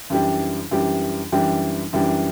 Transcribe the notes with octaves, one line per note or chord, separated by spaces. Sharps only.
F#2 E3 G3 D4 G4
F#2 E3 G3 D4 G4
F#2 E3 G3 D4 G4
F#2 E3 G3 D4 G4